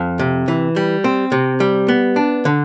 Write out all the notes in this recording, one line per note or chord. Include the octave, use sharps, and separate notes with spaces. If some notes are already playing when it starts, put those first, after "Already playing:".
Already playing: F2
C3
E3
G3
C4
C3
G3
B3
D4
D3